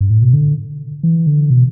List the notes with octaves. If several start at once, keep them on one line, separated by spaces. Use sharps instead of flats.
G2
A2
B2
D3
E3
D3
B2